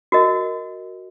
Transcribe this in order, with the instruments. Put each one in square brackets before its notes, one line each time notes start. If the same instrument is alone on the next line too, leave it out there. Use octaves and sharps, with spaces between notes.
[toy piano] F#4 A#4 D#5